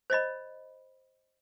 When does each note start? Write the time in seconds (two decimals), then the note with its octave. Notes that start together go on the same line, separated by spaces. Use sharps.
0.10 C5 D5 D#5 B5